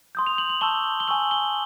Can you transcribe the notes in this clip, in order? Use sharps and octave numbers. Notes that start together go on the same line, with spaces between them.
C6 D#6 G6
F7
F#7
F#7
A5 C#6 E6 G6 G7
G7
G#5 C#6 E6 F#7
G7